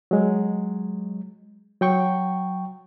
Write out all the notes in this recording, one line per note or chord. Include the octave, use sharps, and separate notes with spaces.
F#3 G#3
F#3 G5 C#6